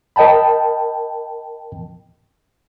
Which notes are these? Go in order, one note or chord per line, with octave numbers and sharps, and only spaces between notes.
A#4 D#5 G5 A5 B5